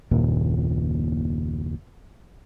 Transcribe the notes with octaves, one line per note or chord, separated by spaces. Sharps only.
F#1 D#2 A#2 A#3